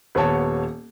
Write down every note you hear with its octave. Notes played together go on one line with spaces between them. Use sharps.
D#1 B3 C#5 A5